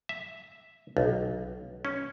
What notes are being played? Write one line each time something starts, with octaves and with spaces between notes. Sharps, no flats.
E5
B1
C#4